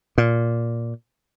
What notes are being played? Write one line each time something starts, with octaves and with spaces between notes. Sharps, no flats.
A#2